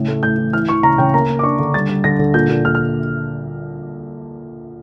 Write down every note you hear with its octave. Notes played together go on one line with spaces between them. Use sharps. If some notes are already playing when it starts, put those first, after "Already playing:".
Already playing: A2 C#3
A3
A2 G6
E3
E3 F6
E3 C#6
C#3 A#5
C#3 G5
A#3 A#5
A#3
D6
D4 C#6
D3
G3 A6
G3
D3 A#6
D3
A#2 G6
A#2
A#2 F6
F6